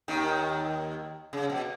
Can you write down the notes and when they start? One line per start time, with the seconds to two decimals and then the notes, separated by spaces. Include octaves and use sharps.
0.08 D#2 D#3
1.33 C#3
1.50 B2